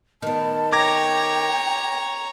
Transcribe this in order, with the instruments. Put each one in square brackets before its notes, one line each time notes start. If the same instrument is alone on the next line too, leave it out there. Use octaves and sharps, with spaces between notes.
[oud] D#3 B3 [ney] A5
[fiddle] C#5 A#5 [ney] G5 [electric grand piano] D6 G#6 A#6